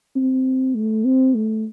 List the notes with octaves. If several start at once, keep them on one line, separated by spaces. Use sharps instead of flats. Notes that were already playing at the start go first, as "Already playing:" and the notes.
C4
A3
C4
A3